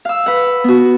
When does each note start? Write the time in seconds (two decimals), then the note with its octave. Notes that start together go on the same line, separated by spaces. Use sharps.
0.05 F5 E6
0.26 B4 F#5
0.64 B3 F#4